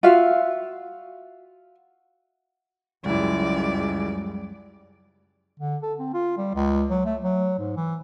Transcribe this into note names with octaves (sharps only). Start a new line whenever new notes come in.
F4 F#4 E5 F5
C#2 F#2 G3 G#3 E4 D5
D3
A4
C4
F4
G3
C#2
F#3
A3
F#3
G#2
E3